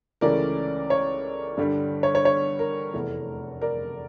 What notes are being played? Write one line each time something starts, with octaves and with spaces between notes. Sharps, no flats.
C#2 C#3 E3 A3 C#4 A#4 D5
C#5
G2 D3 G3
C#5
C#5
C#5
A#4
F1 E2 E3 A3
A#4 D5